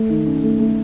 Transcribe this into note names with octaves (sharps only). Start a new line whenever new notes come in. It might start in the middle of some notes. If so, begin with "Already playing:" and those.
Already playing: A3
D#3
C#4
A3
A3